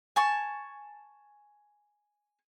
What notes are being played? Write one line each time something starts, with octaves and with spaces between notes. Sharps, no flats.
G#5 A5 C#6